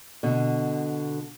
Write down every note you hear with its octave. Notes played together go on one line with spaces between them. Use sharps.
B2 D3